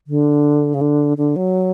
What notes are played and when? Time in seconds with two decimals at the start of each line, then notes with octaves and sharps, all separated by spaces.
0.07 D3
0.74 C#3
0.81 D3
1.17 D3
1.36 F#3